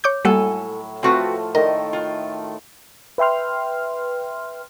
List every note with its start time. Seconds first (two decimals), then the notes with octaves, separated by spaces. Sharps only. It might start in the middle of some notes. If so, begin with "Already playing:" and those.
0.04 C#5 D6 G6
0.25 A2 F#3 G3 A#3 A4 F#5 G#5
1.03 F3 A3 C4 F4 F#4 B4
1.55 A2 D#3 A3 A#4 D#5
1.93 F4
3.18 B4 E5 G5 C6 F6